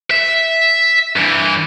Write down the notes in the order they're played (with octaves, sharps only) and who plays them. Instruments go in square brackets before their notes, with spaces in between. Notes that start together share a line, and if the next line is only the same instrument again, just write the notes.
[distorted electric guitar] E5
G2 E3